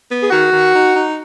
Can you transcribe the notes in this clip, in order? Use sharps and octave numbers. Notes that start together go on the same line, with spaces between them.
B3
G#4
D#3 F#4
D#3
D#4
D#4